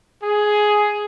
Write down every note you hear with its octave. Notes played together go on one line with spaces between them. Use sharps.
G#4